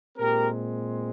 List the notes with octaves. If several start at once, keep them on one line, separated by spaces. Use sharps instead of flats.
A#2 G#3 C4 G4 A#4